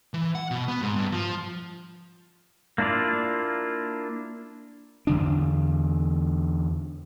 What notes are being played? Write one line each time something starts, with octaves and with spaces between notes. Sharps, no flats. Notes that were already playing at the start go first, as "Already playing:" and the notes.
E3
F#5
B2
B3
G#2
G2
F3
A#3 D4 E4 F4 D5
E2 D3 D4